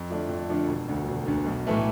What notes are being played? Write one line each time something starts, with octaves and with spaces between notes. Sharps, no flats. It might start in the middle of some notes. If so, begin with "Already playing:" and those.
Already playing: F2
D3 F3 A3 D4
F2
D3 F3 A3 D4
E1
D2 D3
E1
D2 D3
B1
A2 E3 A3